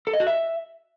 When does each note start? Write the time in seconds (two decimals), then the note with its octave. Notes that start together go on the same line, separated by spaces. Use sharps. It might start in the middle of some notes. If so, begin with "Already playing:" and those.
0.07 A4
0.13 D#5
0.20 F#4
0.27 E5